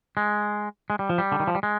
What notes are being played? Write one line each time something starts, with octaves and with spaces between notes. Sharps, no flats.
G#3
G#3
G3
F3
G3
D3
D#3
F3
G3
G#3